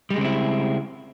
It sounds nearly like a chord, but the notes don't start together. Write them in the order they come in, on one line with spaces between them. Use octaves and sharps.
G3 G#3 C#3 C4 E4